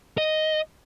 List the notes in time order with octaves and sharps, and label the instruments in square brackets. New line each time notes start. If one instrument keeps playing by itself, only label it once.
[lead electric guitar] D#5